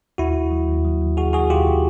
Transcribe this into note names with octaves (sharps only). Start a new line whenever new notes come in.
D#2 E4 F#4
D#2
F#3
D#2
F#3
D#2
D#2 F#4 G#4
D#2 F#4 G#4
D#2 F4 G4